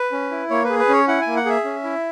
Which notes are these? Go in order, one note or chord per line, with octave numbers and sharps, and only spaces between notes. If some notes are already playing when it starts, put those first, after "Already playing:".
Already playing: B4
C#4
E4
A#3 C#5
B4
G#4
B4
C#4 C#5
E4 F#5
G#5
A#3
F#5
G#4 E5
C#4
E4